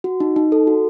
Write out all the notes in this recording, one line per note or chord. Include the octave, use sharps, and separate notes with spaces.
F#4
D#4
D#4
A4
F#4